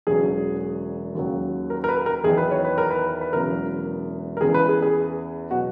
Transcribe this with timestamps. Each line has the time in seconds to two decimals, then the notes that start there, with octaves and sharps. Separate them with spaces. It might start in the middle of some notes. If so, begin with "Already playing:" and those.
0.07 E1 E2 C#3 F#3 G#4
1.15 D#2 C#3 F#3
1.70 A#4
1.84 A#4
1.88 B4
2.06 A#4
2.24 E2 D#3 F#3 G#4
2.37 B4
2.51 C#5
2.65 B4
2.78 A#4
2.90 B4
3.21 B4
3.33 E1 E2 C#3 F#3 A#4
4.37 A#4
4.41 E2 C#3 E3 G#4
4.54 B4
4.69 G#4
4.82 G#4
5.51 B2 F#3 F#4